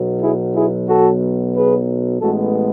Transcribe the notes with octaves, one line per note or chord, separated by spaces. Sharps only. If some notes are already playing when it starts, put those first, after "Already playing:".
Already playing: B1 B2 F#3
E4 G#4
E4 G#4
F#4 A4
G#4 B4
A1 A2 G#3 B3 F#4 A4